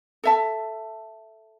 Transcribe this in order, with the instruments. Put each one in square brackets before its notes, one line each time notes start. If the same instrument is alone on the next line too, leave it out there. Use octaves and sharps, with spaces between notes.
[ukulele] A4 E5 A5